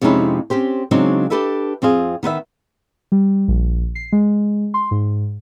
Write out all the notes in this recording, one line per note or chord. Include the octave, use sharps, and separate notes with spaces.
F2 C3 G#3 C#4 D#4 E4
C4 C#4 G4 C5
C#3 F#3 G#3 C4 D4 D#4
D4 D#4 G4 A4 B4 E5
F2 C4 F4 G#4
D#3 B3 B4 E5
G3
A#1
C7
G#3
C6
G#2